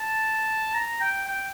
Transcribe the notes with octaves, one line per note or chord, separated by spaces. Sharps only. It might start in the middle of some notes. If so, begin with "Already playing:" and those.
Already playing: A5
A#5
G5
G5